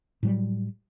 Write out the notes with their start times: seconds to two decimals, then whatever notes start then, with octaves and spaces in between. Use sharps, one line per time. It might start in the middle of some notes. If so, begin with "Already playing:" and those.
0.23 A2 F#3 G3